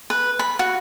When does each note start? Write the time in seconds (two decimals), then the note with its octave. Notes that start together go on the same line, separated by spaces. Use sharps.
0.10 B4
0.39 B5
0.59 F#4